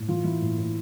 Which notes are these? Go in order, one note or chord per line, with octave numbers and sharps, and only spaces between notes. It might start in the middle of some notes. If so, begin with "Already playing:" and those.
Already playing: A2
E3 F4
E3 E4
A2
A2